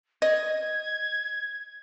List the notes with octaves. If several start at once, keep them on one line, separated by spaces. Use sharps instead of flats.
D#5 G#6